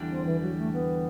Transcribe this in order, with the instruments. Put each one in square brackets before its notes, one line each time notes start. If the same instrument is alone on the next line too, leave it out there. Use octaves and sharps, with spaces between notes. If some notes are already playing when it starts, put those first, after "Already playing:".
Already playing: [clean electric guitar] E2 D3 G3 D4
[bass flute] C4
E3
F#3
A3
B3